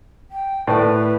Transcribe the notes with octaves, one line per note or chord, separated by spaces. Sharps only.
G5
A2 B4 D5